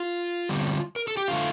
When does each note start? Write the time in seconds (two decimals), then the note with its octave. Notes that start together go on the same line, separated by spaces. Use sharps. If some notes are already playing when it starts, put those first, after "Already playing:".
Already playing: F4
0.49 D3 G3 C4
0.96 A#4
1.08 A4
1.17 G4
1.28 D3 A3 F4